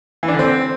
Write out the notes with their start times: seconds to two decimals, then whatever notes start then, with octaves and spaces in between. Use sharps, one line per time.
0.23 E3
0.28 D4
0.34 D3
0.39 C4